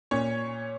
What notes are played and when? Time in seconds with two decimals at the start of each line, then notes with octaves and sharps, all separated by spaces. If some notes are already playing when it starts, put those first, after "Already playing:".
0.11 A#2 C#4 C#5